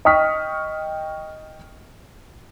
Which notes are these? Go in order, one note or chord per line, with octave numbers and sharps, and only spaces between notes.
D#5 G5 C#6 D#6 F6 B6